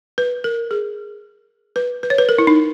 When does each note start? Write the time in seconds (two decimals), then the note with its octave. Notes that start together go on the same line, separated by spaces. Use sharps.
0.18 B4
0.44 A#4
0.71 G#4
1.76 B4
2.03 B4
2.10 C#5
2.18 B4
2.29 A#4
2.38 E4
2.47 D#4